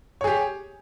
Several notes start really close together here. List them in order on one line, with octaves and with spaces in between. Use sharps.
C#5 G#4 G4